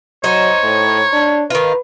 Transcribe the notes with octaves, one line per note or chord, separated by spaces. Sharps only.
F#3 D#4 C5 C#5
A2
D4
D#3 F4 B4